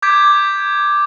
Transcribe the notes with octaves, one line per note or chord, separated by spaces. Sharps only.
D6 G6 G#6 B6 D7